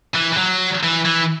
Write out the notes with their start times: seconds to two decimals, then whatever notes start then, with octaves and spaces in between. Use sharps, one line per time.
0.15 E3
0.33 E3
0.38 F#3
0.84 E3
1.06 E3